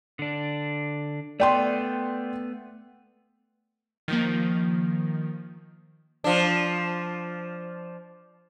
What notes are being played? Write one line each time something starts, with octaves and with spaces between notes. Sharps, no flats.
D3 D4
A3 B3 D5 G5 C6
D#3 F3 A#3
F3 D4